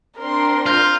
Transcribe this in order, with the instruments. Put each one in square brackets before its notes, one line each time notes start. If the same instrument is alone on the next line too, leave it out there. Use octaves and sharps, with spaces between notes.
[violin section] C4 D4 C6 [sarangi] A#4
[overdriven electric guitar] F4 [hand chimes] F6 G6 A#6